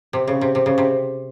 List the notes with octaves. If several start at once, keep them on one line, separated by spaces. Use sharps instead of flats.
C3
C#3
C3
C3
C#3
C3